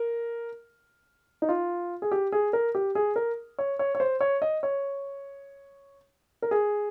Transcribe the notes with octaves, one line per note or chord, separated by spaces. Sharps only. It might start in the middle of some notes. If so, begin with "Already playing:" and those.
Already playing: A#4
D#4
F4
G#4
G4
G#4
A#4
G4
G#4
A#4
C#5
C#5
C#5
C5
C#5
D#5
C#5
A#4
G#4